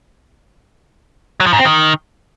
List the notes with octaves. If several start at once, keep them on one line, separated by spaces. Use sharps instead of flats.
F#3
F3
G#2
C4
D#3